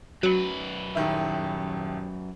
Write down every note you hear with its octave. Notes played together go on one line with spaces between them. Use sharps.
F#2 F#3 B4
D#1 D#3 E4